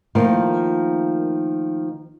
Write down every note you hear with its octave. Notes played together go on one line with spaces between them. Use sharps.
D#3 F3 A3 A#3 F4